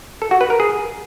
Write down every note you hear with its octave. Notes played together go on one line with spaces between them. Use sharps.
A4
F#4
B4
A#4
G#4